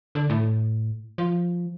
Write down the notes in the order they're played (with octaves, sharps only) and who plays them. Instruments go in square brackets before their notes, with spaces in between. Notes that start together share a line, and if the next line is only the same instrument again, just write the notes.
[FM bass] D3
A2
F3